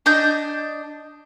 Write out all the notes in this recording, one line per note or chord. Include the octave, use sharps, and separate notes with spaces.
D4 D#5 G6